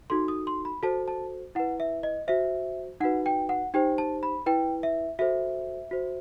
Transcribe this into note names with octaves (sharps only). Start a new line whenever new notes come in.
D#4 F#4 A4 C6
D#6
C6
B5
F#4 A4 C5 A5
A5
E4 B4 F#5
E5
D#5
F#4 C5 E5
D#4 F#4 B4 F#5
G5
F#5
D#4 G4 C5 G5
A5
B5
E4 B4 G5
E5
F#4 A4 C5 E5
F#4 C5